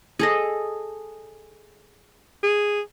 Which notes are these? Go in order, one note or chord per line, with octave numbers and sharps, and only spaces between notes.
G#4 A4 D#5
G#4